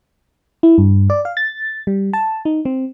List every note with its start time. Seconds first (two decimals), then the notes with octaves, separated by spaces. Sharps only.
0.63 E4
0.78 G2
1.10 D5
1.25 F5
1.37 A6
1.87 G3
2.13 A5
2.45 D#4
2.65 C4